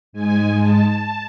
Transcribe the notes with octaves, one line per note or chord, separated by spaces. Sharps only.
G#2 G#3 G#5
A5